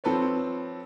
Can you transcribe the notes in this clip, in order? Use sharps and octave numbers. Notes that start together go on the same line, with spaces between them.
F3 C4 A4 B4 C#5